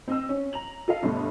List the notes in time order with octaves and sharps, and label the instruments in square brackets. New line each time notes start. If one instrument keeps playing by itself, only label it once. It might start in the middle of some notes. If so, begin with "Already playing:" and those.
[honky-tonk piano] C4 D#5 E6
C#4
A#5 F7 F#7
F4 A4 D#5 F5
G1 G2 B2 A3